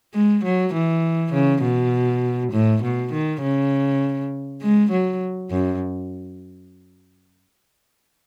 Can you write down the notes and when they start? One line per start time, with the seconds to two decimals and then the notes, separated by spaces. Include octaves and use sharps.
0.14 G#3
0.44 F#3
0.74 E3
1.33 C#3
1.63 B2
2.52 A2
2.82 B2
3.12 D#3
3.42 C#3
4.62 G#3
4.91 F#3
5.50 F#2